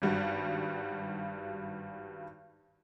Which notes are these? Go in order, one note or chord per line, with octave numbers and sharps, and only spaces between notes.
G#1 G2 G3 F#4